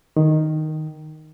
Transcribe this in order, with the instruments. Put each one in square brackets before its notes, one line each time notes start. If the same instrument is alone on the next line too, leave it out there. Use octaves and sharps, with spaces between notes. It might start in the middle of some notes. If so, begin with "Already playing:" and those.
[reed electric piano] D#3